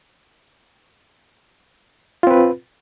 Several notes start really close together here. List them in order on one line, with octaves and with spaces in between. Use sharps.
F4 C4 B4